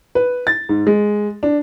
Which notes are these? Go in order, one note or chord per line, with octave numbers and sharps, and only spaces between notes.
B4
A6
G#2
G#3
D4